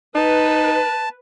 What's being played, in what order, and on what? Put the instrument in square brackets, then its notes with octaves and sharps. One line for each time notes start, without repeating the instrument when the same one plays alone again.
[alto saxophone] D#4 [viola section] B4 [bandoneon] A5